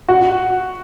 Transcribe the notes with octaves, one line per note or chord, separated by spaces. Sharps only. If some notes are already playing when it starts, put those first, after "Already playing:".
F#4